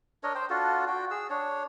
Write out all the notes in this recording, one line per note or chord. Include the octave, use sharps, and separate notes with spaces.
D4 A#4 C#5 D#5
C5 G5
D4 F4 F#4 A4
F#4 G5
G#4 E6
D4 C#5